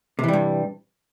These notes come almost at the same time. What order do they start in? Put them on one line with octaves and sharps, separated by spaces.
C3 E3 G3 G2